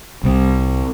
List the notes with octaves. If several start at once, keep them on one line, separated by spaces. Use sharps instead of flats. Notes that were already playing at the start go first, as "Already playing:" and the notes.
C2